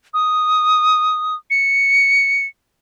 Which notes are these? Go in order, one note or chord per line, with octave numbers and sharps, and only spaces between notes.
D#6
C#7